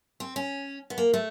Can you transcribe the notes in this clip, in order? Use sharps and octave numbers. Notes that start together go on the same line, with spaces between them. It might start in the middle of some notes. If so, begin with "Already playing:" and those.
C4
C#4
B3
A#3
A3